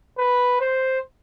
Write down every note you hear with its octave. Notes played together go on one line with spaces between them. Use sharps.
B4
C5